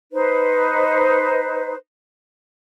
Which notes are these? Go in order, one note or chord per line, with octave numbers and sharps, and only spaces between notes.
D#4 B4 C5